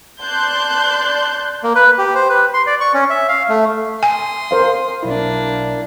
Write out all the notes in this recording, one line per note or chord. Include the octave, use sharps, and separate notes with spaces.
D5 A5 C6 F#6 G6
A#3
B4
G4
C5
B4
C6
D5
C#6
C#4
E5
F5
A3
G#5 C6 D#6
A#4 C5 F5
B1 A#3 D4 E4